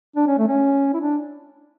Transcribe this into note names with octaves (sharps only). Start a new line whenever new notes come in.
D4
C#4
A3
C#4
E4
D4